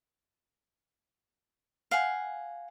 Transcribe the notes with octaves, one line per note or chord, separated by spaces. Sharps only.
F5 F#5 G#5